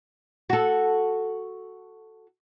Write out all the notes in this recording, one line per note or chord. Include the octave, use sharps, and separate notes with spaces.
F#4 A4